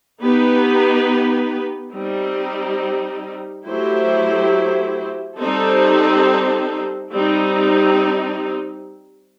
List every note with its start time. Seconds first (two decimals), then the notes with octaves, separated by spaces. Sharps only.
0.20 B3 D#4 G4 B4
1.93 G3 C4 D#4
3.66 F#3 A3 E4 G4 C5
5.39 G3 C4 D#4 A4 C5
7.12 G3 C4 D#4